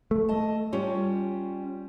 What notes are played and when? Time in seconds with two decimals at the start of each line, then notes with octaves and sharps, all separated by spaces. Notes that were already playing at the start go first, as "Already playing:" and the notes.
0.11 A3
0.29 D#5 A5
0.73 G3 C#4 F4